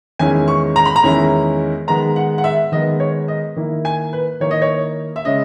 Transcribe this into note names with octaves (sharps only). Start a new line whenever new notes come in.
E2 D#3 G#3 C#4 E4 G#5
C#6
A#5
B5
A#5
E2 D#3 G#3 C#4 E4
D#3 G#3 B3 A#5
F#5
F#5
E5
D#3 G#3 B3 D#5
C#5
D#5
D#3 A#3 E4
G#5
B4
D#3 A#3 E4 C#5
D#5
C#5
E5
C#3 G#3 C#4 D#5